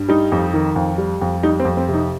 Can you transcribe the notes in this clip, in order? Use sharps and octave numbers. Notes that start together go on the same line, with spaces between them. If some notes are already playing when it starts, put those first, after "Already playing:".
Already playing: G2
G3 D#4
F2
D#3
F2
G3
F2
G3 D#4
C4
F2
C4
C3
D#4